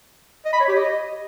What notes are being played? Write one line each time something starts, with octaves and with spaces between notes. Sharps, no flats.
D#5
B5
C#5
G4
D#5